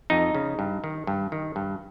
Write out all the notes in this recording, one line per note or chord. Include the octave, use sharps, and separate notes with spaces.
F2 D#4
C#3
G2
D#3
G2
D#3
G2